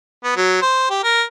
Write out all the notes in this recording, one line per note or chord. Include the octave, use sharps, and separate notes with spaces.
B3
F#3
C5
G4
A#4